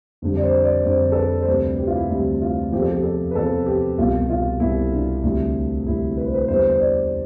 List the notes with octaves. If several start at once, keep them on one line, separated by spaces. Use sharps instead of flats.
F2 D3 G3
D5
C5
D5
F2 D3 G3 C5
A4
B4
C5
D2 C3 G3 B4
G4
F4
E4
D2 C3 G3 E4
F4
E2 C3 F3 G4
A4
G4
A4
B4
E2 C3 F3 A4
G4
C2 B2 G3 F4
F4
C2 B2 G3 E4
D4
D2 C3 G3
D2 C3 G3 E4
B4
C5
B4
E2 D3 G3 C5
C5
D5